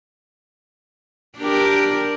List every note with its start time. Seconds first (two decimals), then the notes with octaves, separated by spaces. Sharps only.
1.39 D4 G4 A#4